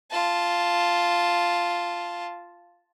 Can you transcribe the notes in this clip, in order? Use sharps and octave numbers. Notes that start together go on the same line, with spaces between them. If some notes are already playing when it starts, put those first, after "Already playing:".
F4 A5